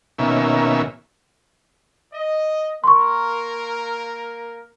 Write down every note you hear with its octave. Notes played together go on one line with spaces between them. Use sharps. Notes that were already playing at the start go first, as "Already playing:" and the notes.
B2 D#3 A#3 C#4 E5
D#5
A#3 A#4 C6 C#6